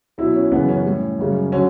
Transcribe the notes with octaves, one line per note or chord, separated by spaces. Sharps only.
B2 F#3 E4
C#4
F#2 C#3 E3 B3
C#4
A2 G3
F#2 C#3 G3
D3 F#3 C#4